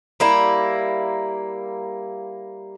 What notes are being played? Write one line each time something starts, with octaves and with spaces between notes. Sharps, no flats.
G3 A#3 E4